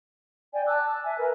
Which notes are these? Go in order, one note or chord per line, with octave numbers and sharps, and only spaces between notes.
D5 G5 G#5
A5 D6 E6 F#6
E5 G#5
A#4 B4